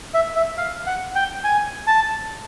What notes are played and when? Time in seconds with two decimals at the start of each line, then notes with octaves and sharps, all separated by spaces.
0.14 E5
0.36 E5
0.58 F5
0.87 F#5
1.15 G5
1.44 G#5
1.87 A5